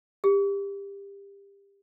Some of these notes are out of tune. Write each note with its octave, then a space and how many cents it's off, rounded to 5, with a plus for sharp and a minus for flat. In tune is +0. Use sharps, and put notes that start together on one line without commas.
G4 +25